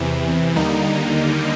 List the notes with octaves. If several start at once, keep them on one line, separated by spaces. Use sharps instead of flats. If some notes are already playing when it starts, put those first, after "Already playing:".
Already playing: E2 C3 E3
D#2 D3 G3 A#3 D#4